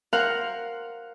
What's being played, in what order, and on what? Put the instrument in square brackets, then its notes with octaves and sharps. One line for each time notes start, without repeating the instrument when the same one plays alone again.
[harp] A#4 C5 F5 F#5